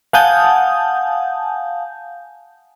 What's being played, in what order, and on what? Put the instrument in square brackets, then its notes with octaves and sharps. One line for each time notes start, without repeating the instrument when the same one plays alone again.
[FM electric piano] F5 F#5 G#5 A5 D#6 G6